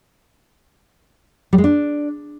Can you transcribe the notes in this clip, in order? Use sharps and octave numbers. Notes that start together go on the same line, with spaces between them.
G3
G#3
D4